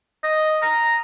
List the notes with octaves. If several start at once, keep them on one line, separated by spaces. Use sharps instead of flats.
D#5
A#5